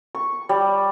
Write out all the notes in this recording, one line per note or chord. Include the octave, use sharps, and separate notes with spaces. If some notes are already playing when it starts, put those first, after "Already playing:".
C#6
G3